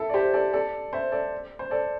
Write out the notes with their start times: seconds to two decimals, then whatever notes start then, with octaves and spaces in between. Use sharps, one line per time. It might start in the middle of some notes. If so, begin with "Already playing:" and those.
Already playing: E4 A4
0.09 D5
0.14 G4 C5
0.34 A4 D5
0.53 A4 D5
0.93 C5 E5
1.12 A4 D5
1.59 C5
1.71 A4 D5